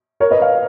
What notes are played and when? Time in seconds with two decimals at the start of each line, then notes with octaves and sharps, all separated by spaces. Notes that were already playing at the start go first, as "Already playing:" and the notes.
0.20 A#4 C#5
0.31 B4 D#5
0.42 C#5 F5